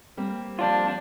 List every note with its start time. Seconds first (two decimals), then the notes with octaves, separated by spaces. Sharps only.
0.17 G3 A#3 C4
0.59 F3 D4 F4